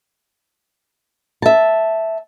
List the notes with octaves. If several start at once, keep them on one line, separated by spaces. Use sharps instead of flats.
E5 A5